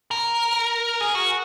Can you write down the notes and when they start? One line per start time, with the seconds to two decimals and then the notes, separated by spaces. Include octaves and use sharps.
0.11 A#4
1.01 G#4
1.15 F#4